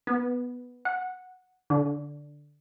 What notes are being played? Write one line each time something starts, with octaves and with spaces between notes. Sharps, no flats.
B3
F#5
D3